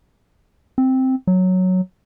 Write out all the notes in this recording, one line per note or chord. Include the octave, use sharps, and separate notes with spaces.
C4
F#3